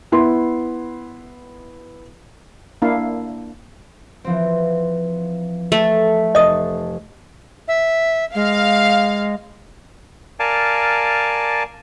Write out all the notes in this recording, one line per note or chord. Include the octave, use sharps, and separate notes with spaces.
B3 E4 C6
A#3 D4 E4 F5
E3 F3 C4
A3 A4
F1 D#5 D#6
E5
G#3 F5
A#4 D5 F5 G#5 A5